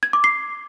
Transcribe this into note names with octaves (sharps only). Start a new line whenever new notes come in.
G#6
D6
C7